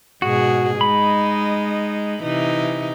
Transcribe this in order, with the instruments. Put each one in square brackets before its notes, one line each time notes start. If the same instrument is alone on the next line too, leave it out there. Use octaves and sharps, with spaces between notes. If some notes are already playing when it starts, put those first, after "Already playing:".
[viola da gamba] G#2 B2 G#4 [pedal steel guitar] F#4
[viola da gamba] G#3 D#4 [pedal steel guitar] B5
[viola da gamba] C3 E3 D#4